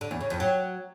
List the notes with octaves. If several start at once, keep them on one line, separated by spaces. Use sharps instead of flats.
D3
E2
C#3
F2
F#3